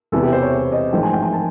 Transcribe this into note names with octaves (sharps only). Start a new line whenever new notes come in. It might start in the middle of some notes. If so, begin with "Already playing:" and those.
E1 E2 C3 E3 A4
G4
C5
C#5
D#5
A1 G#2 F3 G#3 G5
G#5
G5
G#5
A5